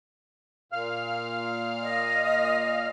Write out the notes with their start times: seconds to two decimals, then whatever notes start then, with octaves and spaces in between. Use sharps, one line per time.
0.72 A#2 F5 F6
1.82 D#5